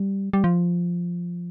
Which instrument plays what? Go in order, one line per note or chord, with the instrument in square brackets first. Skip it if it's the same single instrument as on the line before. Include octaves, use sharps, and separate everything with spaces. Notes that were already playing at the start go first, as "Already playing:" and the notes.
Already playing: [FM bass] G3
G3
F3